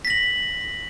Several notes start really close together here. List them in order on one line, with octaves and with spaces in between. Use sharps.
B6 A#6 F#7